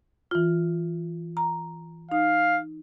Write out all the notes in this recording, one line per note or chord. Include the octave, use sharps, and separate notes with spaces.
E3 F4
A#5
D#4 F5